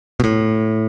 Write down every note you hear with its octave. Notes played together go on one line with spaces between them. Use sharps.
B2
A2